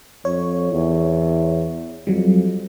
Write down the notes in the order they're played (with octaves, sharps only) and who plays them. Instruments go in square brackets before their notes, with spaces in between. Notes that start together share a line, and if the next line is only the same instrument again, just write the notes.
[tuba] F2 [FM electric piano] C#5
[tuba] E2
[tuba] F2 [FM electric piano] F#3 G3